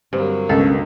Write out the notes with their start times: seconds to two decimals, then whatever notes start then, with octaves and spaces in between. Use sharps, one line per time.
0.13 G2 D3 F#3 A#3 C4
0.49 C#2 B2 C#4 A4